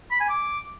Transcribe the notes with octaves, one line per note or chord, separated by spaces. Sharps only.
B5
G#5
D6